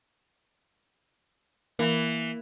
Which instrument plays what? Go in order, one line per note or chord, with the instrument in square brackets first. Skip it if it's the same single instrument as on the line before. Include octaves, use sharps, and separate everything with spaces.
[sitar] E3 [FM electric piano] A#3